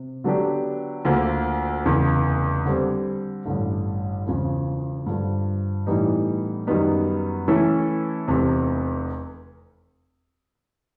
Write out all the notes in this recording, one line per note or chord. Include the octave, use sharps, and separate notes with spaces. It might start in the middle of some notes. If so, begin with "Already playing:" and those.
Already playing: C3
D3 F#3 B3 D4 G4
D2 D3 F3 A#3
F1 E2 C#3
D3 G3 C4
A1 G2 D3
E1 E2 C#3 F3
G2 D3 F3
A2 E3 G3 B3 D#4
F#2 D#3 G3 B3 D#4
E3 A3 C#4 E4 A4
F1 E2 C3